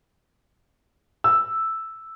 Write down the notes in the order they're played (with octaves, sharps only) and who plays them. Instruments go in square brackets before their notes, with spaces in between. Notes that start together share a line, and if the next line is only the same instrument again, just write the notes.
[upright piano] E6